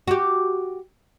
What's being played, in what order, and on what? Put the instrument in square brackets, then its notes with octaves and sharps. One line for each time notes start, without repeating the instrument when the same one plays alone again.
[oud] F#4 G4